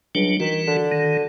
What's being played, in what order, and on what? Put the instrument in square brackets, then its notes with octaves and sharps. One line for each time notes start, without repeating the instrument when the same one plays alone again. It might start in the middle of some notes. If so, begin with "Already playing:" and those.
[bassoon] C#2 [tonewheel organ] F#3 G3 D4
[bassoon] D#3 [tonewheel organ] E3 F#4
[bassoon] D3
[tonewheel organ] D#3